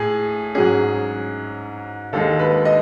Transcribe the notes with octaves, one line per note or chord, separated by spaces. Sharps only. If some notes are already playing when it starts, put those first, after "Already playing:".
Already playing: A2 G#4
G#2 F#3 C#4 G#4
D#2 D#3 G#3 A4
B4
D#5